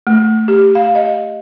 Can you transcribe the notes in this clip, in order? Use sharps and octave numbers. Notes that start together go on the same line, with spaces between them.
A3
G4
F5
D#5